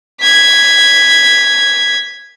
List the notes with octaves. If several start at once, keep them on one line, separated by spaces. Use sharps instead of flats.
G#6 B6